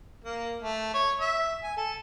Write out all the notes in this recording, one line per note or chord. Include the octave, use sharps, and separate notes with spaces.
A#3
A3
C#5
E5
G#5
A4